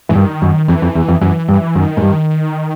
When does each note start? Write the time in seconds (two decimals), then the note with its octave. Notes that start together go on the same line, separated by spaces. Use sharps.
0.09 G#2 E3
0.15 G2 D#3
0.42 F#2
0.68 F2 E3
0.82 F2
0.95 E2
1.08 F2
1.21 F#2 E3
1.49 G2
1.75 F#2 D#3
1.97 G#2
2.02 G2